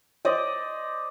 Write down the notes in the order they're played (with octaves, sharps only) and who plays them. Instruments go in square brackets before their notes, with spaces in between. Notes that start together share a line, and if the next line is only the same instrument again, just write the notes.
[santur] C5 D5 D#5